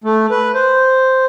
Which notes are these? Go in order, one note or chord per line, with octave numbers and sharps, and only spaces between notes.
A3
B4
C5